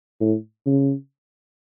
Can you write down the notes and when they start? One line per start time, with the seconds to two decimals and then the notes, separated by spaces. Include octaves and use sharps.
0.20 A2
0.66 C#3